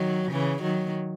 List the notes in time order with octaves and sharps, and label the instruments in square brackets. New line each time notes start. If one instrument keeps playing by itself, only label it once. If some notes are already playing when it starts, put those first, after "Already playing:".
Already playing: [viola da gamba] D#3 F#3
C#3 E3
D#3 F#3